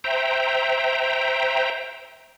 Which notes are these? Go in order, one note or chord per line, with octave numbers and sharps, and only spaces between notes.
C5 E5 G5 A#5